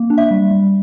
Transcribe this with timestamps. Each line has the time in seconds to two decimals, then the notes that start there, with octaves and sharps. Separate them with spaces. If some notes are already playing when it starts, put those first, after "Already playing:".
Already playing: A#3
0.10 D4
0.18 E5
0.31 G3
0.51 G3